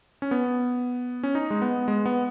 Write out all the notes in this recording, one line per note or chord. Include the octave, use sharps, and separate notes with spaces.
C#4
B3
C#4
D#4
G#3
B3
G#3
B3